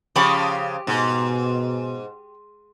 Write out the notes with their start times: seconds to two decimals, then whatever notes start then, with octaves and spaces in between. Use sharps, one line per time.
0.16 C#3 F3 G4 B5 C#6
0.87 G#2 B2